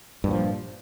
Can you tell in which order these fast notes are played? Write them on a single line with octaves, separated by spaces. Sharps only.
G2 A#2 F3